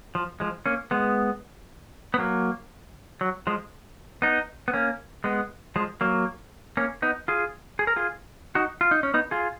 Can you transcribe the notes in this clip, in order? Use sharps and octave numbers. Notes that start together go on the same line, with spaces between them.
F3
F3 G#3
A#3 C#4
G#3 B3
B3
F#3 A#3
F#3
F3 G#3
B3 D#4
B3
A#3 C#4
G#3 B3
F3 G#3
F#3 A#3
A#3 C#4
B3 D#4
F4 G#4
G#4
A#4
F4 G#4
D#4 F#4
F4
D#4
C#4
B3 D#4
F4 G#4